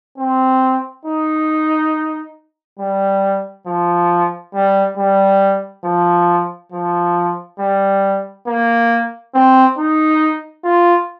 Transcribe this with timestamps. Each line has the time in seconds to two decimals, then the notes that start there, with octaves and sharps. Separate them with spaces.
0.18 C4
1.05 D#4
2.79 G3
3.67 F3
4.55 G3
4.97 G3
5.84 F3
6.72 F3
7.59 G3
8.47 A#3
9.35 C4
9.78 D#4
10.64 F4